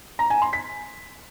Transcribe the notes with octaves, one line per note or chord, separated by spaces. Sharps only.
A#5
G#5
C6
B6